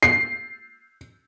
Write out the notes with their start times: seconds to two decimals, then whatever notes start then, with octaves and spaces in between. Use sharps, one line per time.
0.03 C7